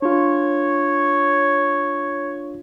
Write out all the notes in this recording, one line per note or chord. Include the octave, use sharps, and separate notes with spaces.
D4 F4 C#5